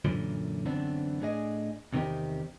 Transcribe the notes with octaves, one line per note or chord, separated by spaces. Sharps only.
F#2 A#2 D3 E3
F#2 D3 E3 B3 C4 D4
A2 D4 G#4 D#5
E2 C3 D#3 C4 D#4 G4